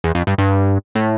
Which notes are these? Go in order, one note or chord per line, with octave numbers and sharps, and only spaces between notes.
E2
F2
G2
G2
A2